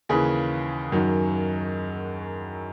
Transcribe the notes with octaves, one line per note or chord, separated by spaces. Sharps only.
D#2 C#3 E3 G#4
F#2 D#3 F#3